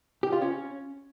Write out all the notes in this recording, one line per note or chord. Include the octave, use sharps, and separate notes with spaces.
G4
F4
C#4